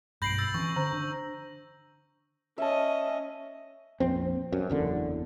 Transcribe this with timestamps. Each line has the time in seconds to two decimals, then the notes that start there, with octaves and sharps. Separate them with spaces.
0.22 B1 G2 B5 G6 A#6 C7 D7 F#7
0.38 E6 G6 A6
0.54 E3 C4 C#4 C#6
0.76 D3 C5 A#5
0.93 D4
2.58 C#4 D#5 E5 A5
4.00 A#1 F2 C4
4.52 F#2
4.70 F#1 E2 D3